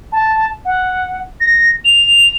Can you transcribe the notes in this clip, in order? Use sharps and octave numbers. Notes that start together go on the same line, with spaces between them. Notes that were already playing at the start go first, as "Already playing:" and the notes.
A5
F#5
A#6
F7